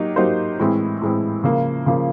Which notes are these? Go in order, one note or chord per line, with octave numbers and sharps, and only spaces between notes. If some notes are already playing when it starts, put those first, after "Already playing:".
Already playing: F#3 A#3 D#4 G4
F#3 A#3 D#4 G4 C5
A2 E3 G#3 C4 E4
A2 E3 G#3 C4 E4
C#3 F3 A#3
C#3 F3 A#3